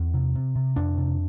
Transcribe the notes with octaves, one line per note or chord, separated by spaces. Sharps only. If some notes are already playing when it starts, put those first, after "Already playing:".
Already playing: E2 C4
C3
C3
C3
F2 D4
C3